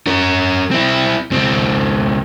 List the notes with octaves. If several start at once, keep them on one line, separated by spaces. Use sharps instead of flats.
C#4 A#4
C4 E4
C#2 C4